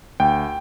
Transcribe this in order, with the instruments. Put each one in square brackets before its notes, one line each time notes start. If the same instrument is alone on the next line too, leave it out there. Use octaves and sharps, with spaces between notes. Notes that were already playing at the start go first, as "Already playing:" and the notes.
[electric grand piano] D2 G5